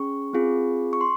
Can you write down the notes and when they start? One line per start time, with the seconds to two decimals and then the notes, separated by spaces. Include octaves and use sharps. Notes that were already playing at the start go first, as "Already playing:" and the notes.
Already playing: C#4 G#4 C#6
0.33 C4 F4 G#4
0.93 C#6
1.01 C6